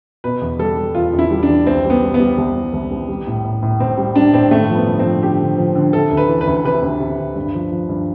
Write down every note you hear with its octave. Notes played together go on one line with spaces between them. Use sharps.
B2 B4
E2
G3 A4
G3
E2 F4
E2
E4
G3
D4
E2
C2 C4
G3
B3
G3
B3
G3
C2
C2
C2
C2
G3
A2
A2
A2
A2 C4
G3
G3 D4
A2 C4
G2 A3
F3
B3
G2
C4
F3
D3 G4
D3
F3
D3
C3 A4
D2
B4
E3
B4
D2
C3 B4
D2
C3
D2
G2
F3
F3
G2